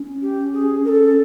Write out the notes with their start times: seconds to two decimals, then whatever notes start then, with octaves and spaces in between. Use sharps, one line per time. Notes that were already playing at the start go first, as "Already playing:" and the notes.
Already playing: C#4
0.22 G4
0.53 G#4
0.85 C#4 A4 A#4